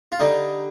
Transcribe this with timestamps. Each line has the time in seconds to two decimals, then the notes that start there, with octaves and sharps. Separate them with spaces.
0.12 F4
0.19 D3 G3 D#4